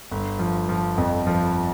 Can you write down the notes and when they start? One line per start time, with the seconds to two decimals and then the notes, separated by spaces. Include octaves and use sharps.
0.11 G1
0.39 F3
0.69 F3
0.98 F2
1.27 F3